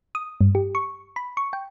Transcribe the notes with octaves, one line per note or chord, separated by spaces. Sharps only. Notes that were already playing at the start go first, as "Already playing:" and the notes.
D#6
G2
G4
C#6
B5
C#6
G5